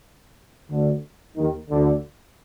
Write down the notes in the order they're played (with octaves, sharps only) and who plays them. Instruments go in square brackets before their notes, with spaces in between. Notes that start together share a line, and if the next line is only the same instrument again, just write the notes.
[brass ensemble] D2 D3
D#2 D#3
D2 D3